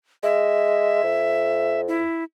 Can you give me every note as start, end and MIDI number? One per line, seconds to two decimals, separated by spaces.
0.23 0.99 56
0.23 1.81 76
1.03 2.03 41
1.88 2.24 64